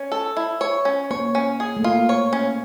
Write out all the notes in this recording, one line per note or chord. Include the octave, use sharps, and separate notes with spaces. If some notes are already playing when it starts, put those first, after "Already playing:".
Already playing: C#4
A4
E4
C#5
C#4
A#3 C#5
C#4
G#4
A3
A#3 F4
C#5
C#4